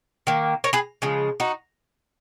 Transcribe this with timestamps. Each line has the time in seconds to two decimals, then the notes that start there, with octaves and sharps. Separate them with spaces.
0.27 D#3 A#3
0.64 A#4 C#5
0.73 G#4 B4
1.02 C#3 F3 G#3
1.40 D#4 F#4